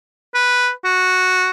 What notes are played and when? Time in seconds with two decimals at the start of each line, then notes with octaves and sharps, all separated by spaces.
0.35 B4
0.85 F#4